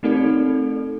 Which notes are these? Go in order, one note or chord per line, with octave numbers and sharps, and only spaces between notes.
A3 C4 D#4 A4 D5